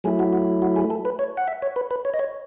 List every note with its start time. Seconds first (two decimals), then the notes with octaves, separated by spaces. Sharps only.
0.04 F#3 A3 E4 G#4
0.19 F#4
0.33 F#4
0.62 F#4
0.76 G#4
0.90 A4
1.05 B4
1.19 C#5
1.37 F#5
1.48 E5
1.62 C#5
1.76 B4
1.91 B4
2.05 C#5
2.14 D#5
2.19 C#5